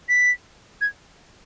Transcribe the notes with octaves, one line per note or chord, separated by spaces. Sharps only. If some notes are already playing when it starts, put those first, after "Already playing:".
B6
G#6